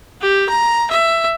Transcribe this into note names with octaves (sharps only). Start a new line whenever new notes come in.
G4
A#5
E5